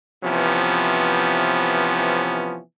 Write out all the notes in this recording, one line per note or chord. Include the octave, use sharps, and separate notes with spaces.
C3 E3 F3 B3 C#4